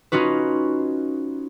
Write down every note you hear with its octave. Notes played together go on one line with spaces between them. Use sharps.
C#4 D#4 F4 F#4 B4